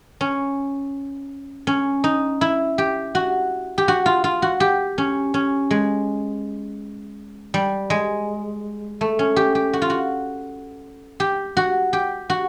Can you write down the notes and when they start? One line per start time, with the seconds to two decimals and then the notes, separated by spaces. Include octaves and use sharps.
0.21 C#4
1.67 C#4
2.04 D#4
2.41 E4
2.78 G4
3.15 F#4
3.78 G4
3.88 F#4
4.06 F4
4.24 F4
4.42 F#4
4.60 G4
4.98 C#4
5.34 C#4
5.71 G#3
7.54 G3
7.90 G#3
9.01 A3
9.19 C#4
9.36 G4
9.55 G4
9.73 F#4
9.82 F4
9.90 F#4
11.20 G4
11.57 F#4
11.93 G4
12.30 F#4